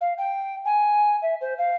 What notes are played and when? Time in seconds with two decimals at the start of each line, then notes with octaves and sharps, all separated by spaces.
0.01 F5
0.18 G5
0.65 G#5
1.22 E5
1.41 C5
1.58 F5